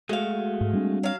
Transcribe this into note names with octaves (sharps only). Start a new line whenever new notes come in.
G#3 A3 F#4 F5
G#2
G3 C4 D4
F#3 F5